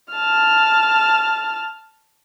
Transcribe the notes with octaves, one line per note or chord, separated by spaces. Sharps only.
A5 F6